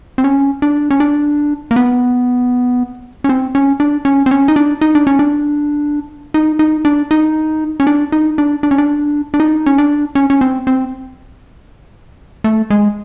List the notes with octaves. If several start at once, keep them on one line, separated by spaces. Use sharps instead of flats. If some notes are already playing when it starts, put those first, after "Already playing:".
C4
C#4
D4
C#4
D4
A#3
B3
C#4
C4
C#4
D4
C#4
C4
C#4
D#4
D4
D#4
D4
C#4
D4
D#4
D#4
D4
D#4
C#4
D4
D#4
D4
D4
C#4
D4
D4
D#4
C#4
D4
C#4
C#4
C4
C4
A3
G#3